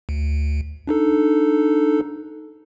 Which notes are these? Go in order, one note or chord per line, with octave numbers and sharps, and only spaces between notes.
D2
D4 D#4 A4